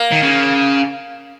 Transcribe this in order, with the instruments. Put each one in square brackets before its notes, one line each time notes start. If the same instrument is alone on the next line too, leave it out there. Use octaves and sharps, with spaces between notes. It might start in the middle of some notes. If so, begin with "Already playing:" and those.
Already playing: [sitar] A#3
[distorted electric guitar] D#3
C#3